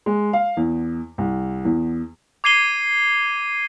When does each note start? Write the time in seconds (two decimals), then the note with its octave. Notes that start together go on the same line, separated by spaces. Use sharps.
0.06 G#3
0.33 F5
0.57 E2
1.18 C2
1.65 E2
2.44 D6 G#6 C7 D#7 G7